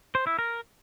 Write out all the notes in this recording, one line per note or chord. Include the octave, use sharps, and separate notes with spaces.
C5
E4
A#4